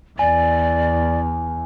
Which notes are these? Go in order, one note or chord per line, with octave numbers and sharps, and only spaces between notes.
E2 D5 G#5